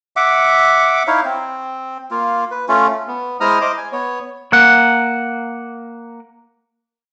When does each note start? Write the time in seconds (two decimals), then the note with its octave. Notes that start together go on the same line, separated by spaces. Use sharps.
0.16 E5 F#5 D6
1.07 D#4 E4 C#5 F5
1.25 C4
2.11 A#3 F4
2.51 B4
2.68 A3 C#4 F4
3.08 B3
3.41 G#3 E4 C5 A#5 D#6 F6
3.61 C5 D#5 D6
3.77 G#5
3.92 B3 C#5
4.52 A#3 F#5